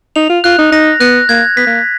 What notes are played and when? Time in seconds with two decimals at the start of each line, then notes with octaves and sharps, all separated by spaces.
0.16 D#4 F7
0.29 F4
0.44 F4 F#6
0.59 D#4
0.72 D#4 A#6
1.00 B3 F#6
1.29 A#3 G#6
1.57 B3 B6
1.67 A#3